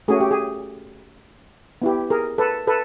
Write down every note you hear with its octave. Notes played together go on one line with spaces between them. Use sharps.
A3 C#4 F#4 G#4
G4
G#4
B3 E4 G4
G#4 A#4
A4 B4
A4 B4